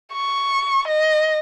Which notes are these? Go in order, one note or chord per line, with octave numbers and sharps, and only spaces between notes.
C#6
D#5